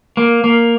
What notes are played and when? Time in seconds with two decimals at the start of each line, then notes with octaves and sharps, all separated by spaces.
0.17 A#3
0.44 A#3